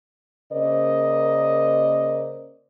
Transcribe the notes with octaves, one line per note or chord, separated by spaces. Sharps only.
C#3 A#3 A#4 C5 D5 D#5